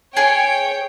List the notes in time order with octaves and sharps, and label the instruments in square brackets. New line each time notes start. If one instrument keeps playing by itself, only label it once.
[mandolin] G#4 [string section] C#5 G5